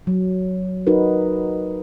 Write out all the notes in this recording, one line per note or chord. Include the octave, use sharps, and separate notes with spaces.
F#3
D#4 F#4 A#4 B4